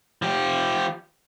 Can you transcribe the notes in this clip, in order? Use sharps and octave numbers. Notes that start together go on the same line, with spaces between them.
F3 G4